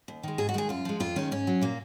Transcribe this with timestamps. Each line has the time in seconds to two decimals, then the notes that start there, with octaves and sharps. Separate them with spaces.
0.08 D#2
0.23 D#3 G#3
0.38 G#2 G#4
0.49 F#4
0.54 D#3 G#3 G#4
0.69 F#2 F4
0.85 F3 G#3
1.00 F2 F4
1.16 D#3 G#3 C#4
1.31 G#2 C#4
1.47 F#3
1.61 A#2 A#3